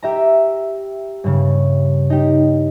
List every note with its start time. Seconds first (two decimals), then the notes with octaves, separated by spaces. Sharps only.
0.03 G4 E5 A#5
1.24 G2 C#3
2.10 D#4 G4